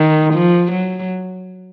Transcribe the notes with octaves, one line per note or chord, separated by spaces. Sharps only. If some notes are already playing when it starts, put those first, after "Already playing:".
Already playing: D#3
F3
F#3